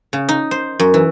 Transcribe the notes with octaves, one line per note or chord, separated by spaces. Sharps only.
C#3
D#4
C5
F#2
E3